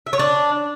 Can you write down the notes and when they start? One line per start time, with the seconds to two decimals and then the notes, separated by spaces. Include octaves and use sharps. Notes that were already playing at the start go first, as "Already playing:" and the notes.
0.07 E5
0.13 C#5
0.19 D4